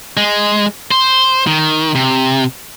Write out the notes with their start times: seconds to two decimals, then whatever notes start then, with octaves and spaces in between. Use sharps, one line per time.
0.17 G#3
0.91 C5
1.47 D#3
1.95 C3